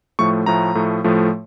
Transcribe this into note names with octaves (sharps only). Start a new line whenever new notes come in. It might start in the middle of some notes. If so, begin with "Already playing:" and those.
A2 F3 A3 C#6
A2 F3 A3 A#5
A2 F3 A3
A2 F3 A3